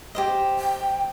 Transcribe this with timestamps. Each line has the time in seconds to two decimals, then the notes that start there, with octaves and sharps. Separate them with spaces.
0.15 G4 C5 D#5
0.58 G5